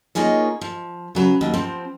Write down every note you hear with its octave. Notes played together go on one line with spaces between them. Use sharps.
A#3 D#4 F4 G#4 C#5
F3
C#3 F#3 B4
D#2 F#3
F3 C4